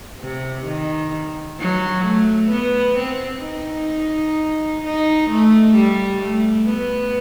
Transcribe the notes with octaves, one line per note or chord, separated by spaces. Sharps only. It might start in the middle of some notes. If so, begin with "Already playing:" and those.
C3
D#3
F#3
A3
B3
C4
D#4
D#4
A3
G3
A3
B3